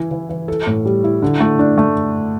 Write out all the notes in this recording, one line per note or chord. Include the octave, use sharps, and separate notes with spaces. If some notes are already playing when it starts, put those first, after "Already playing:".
Already playing: E3 E4
E3
E3
A4
A2
G3
E4
D3
A3
D4
A3